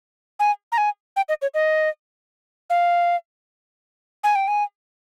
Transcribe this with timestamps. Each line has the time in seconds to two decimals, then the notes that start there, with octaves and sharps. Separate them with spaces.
0.40 G#5
0.72 A#5
0.78 G#5
1.16 G5
1.29 D#5
1.42 C#5
1.54 D#5
2.70 F5
4.24 G#5
4.35 G5
4.48 G#5